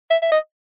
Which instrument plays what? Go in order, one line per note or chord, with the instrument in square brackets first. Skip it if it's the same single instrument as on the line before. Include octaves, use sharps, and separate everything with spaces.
[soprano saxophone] E5
E5
D#5